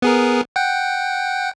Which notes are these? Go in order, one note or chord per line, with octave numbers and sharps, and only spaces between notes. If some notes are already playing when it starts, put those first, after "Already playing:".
B3 G#4 A#4
F#5 G5